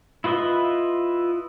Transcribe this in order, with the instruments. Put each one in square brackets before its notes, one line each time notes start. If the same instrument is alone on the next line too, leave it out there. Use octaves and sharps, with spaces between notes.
[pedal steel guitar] E4 F4 B4 D#5 E5